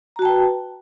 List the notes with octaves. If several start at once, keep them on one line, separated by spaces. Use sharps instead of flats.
F#4 B4 G5 A5 A#5